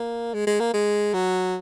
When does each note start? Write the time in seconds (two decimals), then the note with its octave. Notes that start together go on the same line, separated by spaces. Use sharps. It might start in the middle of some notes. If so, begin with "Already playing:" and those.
Already playing: A#3
0.34 G#3
0.47 G#3
0.60 A#3
0.74 G#3
1.14 F#3